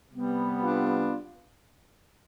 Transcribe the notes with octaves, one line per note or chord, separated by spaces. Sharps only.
C3 G3 B3
D4 F4